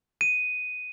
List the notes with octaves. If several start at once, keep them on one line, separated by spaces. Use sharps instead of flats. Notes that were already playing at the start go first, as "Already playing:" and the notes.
D#7